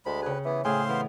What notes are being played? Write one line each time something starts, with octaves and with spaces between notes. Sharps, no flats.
D2 G#3 B5
C#3 G#4 B4
E3 B3
A2 C#3 G#4 C5 F5 C6
E3 B3